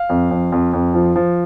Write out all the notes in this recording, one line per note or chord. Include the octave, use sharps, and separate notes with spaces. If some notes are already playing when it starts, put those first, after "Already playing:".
Already playing: F5
F2
F2
F2
F2
F3
F3